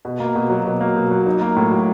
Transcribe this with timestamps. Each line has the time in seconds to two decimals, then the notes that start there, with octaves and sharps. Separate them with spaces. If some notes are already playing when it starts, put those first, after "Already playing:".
0.05 B2
0.20 A#3
0.35 B2
0.50 F#3
0.65 B2
0.81 A#3
0.96 B2
1.11 F#3
1.26 D#4
1.42 A#3
1.56 A2
1.71 F#3